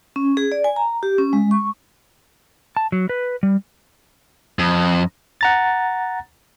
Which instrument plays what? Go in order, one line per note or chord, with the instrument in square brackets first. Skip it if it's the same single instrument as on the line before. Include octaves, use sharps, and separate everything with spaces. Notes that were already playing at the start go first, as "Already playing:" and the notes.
[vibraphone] C#4
G#4
D5
G#5
A#5
G4
C#4
G#3
C#6
[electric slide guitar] A5
F#3
B4
G3
[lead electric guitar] F2
[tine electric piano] F#5 A#5 A6